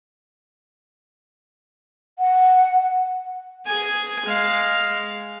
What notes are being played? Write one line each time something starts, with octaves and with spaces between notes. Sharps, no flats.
F#5
G#4 G#5
G#3 F5